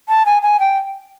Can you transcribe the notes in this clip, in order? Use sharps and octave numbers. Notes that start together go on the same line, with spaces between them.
A5
G#5
G#5
G5